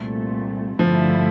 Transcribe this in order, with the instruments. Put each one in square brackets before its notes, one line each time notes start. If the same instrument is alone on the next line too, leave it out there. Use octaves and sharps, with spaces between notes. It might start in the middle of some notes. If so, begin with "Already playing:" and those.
Already playing: [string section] C2 A#2 A3
[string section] G2 D3 A3 E4 [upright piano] F3